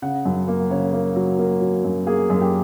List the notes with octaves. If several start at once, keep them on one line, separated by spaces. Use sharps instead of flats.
C#3 F#5
F#2
A#3
C#3 C#5
A#3
F#3
A#3
F#3
F#2
A#3 G#4
F#2
G4